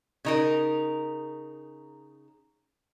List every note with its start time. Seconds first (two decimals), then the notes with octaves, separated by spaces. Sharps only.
0.25 C#3 D#4 A#4